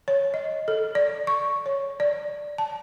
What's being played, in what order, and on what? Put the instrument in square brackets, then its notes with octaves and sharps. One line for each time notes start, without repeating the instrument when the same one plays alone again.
[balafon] C#5
D#5
A4
D5
C#6
C#5
D5
A5